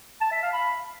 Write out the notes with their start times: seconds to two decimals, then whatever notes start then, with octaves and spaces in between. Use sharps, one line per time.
0.21 A5
0.32 E5
0.42 F5
0.53 B5